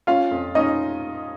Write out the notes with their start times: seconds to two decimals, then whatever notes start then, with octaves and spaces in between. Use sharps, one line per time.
0.07 C#4 F4 F5
0.31 F2
0.55 C#4 D#4 D#5